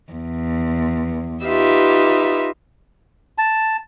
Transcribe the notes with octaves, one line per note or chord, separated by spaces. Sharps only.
E2
D#4 F4 G4 B4 E5
A5